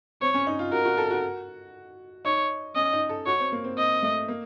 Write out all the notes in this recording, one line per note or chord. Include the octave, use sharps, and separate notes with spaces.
C4 C#5
C#4
D#4
F4
F#4 A#4
F#4
A4
F#4
D#4 C#5
C#4 D#5
D#4
A4
F#4 C#5
C4
A#3
C4
C4 D#5
A3
A#3